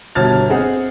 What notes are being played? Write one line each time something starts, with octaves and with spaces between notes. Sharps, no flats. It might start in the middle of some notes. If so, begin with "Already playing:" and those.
G1 B2 A5 F6 G#6 A6
C4 G#4 D#5 F#5